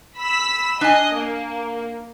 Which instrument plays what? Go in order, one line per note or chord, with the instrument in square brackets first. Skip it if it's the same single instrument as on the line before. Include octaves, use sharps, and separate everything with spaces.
[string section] B5 E6 B6
[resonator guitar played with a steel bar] D4 G#5 [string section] D#5
[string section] A#3